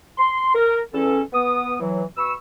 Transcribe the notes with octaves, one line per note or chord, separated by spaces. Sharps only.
C6
A#4
E2 C#4 A4
B3 D#6
E3 F#3
B2 B5 C#6 E6